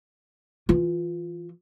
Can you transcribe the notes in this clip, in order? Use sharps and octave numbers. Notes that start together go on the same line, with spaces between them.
E3 F4